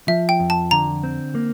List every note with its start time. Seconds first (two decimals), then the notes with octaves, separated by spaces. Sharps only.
0.08 F3 E5
0.29 G5
0.40 F2
0.50 A5
0.71 D3 A#5
1.04 C4
1.35 A#3